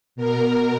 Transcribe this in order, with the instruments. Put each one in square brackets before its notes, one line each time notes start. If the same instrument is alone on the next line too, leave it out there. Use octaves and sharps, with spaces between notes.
[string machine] B2 A#4